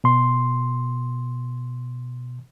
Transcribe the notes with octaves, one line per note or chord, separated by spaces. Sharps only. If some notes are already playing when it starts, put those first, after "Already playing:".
B2 C6